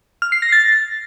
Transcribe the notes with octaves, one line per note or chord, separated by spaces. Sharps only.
F6
C7
A#6
A6